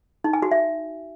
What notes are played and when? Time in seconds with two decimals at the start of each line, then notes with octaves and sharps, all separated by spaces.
0.24 D#4
0.33 G#5
0.42 F#4
0.51 E5